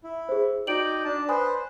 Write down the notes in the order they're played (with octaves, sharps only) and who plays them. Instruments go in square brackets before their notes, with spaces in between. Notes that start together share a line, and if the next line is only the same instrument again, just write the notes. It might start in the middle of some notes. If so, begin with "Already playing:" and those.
[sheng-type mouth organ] E4
[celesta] G#4 C5
[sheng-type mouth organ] D#4 D5 G5 [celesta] F#4 D7 F#7
[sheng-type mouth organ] D4 A5
[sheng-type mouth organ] B4 C5 [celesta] G#5 B5 D#6